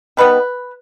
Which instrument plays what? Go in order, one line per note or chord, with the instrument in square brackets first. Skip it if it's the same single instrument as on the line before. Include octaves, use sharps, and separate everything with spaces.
[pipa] D#3 G3 B3 B4